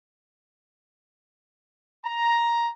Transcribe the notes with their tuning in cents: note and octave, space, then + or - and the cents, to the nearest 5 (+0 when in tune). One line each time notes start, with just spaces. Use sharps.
A#5 +10